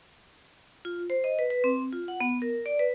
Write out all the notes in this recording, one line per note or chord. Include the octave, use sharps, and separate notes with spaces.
F4
C5
D#5
B4
B4
C4
F4
F#5
B3
A#4
D5
B4